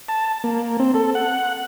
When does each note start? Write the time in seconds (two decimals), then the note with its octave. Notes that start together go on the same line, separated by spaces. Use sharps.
0.08 A5
0.44 A#3
0.79 C4
0.94 A4
1.15 F#5